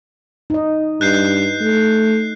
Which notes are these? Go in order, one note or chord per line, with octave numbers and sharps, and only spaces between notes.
D#4 D#5
G2 F#6 G6 C7
A3